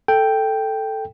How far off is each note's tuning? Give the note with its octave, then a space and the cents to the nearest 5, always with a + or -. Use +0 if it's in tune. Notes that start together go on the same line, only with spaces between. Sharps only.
A4 +0 G5 +0